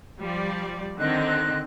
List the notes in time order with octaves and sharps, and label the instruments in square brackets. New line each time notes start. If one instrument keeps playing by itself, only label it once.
[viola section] F3 G3 D5
[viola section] D3 D#3 C4 [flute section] D#5 F#6